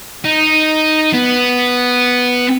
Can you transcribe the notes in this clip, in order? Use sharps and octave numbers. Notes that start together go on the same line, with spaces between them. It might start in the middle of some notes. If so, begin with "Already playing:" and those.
D#4
B3